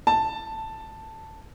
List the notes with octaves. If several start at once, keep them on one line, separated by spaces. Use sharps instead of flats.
A5